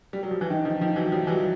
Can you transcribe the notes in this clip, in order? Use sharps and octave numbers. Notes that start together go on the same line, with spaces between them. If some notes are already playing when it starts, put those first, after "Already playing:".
G3
F#3
F3
E3
D#3
D#3 F3
D#3 F3
E3 F#3
F3 G3
E3 F#3